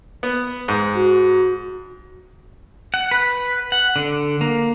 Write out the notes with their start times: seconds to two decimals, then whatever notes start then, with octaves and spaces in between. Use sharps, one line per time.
0.23 B3
0.68 G#2
0.95 F#4
2.94 F#5
3.11 B4
3.72 F#5
3.96 D3
4.41 A#3